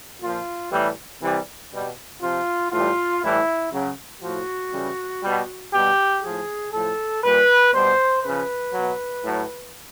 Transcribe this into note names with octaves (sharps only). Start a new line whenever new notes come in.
A#2 F3 F4
A2 E3 G3
C3 E3 G3
B2 G3
C3 F3 F4
A2 E3 G3 F4
A2 E3 G3 E4
C#3 F#3
A2 F3 F#4
C#3 E3 G3
B2 G3
B2 G3 G4
A2 F3 G#4
A2 F3 A4
A#2 G3 B4
B2 G3 C5
C#3 F3 B4
B2 F#3
A2 F#3